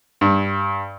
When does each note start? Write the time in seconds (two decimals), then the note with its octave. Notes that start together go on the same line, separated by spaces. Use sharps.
0.21 G2